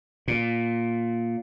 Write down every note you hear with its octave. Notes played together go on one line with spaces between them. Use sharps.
A#2